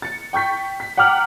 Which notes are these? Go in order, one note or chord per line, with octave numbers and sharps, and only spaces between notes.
A6 C#7
G5 C#6 G6 B6
B6
F#5 G5 A#5 D6 F6 F#7